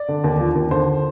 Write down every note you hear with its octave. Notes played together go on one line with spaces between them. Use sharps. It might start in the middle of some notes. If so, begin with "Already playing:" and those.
Already playing: D5
D3
D#2
F3
D#2
D3 C5